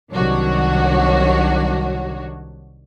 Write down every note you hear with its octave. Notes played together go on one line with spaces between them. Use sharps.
C2 D#3 F#3 D4 F#4 C#5